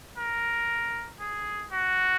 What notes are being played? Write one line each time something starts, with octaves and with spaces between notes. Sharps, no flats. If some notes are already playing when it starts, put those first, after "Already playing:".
A#4
G#4
F#4